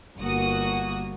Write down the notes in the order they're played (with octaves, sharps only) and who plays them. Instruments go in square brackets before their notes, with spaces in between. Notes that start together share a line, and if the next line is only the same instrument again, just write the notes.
[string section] G1 A#3 F#4 D#6